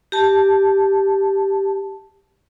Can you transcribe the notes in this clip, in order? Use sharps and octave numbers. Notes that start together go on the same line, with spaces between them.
G4 A5